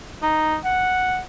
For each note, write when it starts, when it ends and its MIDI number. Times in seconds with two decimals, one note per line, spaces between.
0.23 0.57 63
0.65 1.20 78